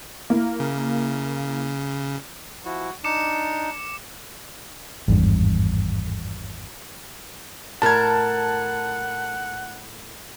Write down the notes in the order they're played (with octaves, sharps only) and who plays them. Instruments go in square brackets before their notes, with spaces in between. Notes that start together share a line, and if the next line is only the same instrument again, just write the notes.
[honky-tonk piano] A#3 E4
[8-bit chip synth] C#3
[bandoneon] F3 E4 [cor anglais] F#4
[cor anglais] D4 [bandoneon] D#4 [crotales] D6 C#7 E7
[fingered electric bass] G#1 E2 G2
[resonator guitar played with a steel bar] A2 A#4 [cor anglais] F#5 [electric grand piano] A5 G#6